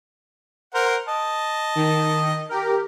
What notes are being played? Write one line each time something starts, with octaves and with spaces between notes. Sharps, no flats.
A#4 C5 F#5
D#5 A5
D#3
G4 A#4